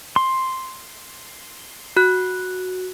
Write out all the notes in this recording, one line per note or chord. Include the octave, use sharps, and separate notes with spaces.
C6
F#4 F#6